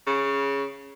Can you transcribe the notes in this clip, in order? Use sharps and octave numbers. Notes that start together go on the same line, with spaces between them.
C#3